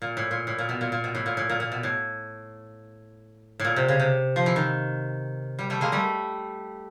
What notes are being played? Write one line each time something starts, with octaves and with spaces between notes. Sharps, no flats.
A#2
A2
A#2
A2
A#2
B2
A#2
A#2
B2
A2
A#2
A2
A#2
A#2
B2
A2
A2
A#2
C3
C#3
C3
F3
E3
D#3
G3
G3 A3
G#3 A#3
G3 A3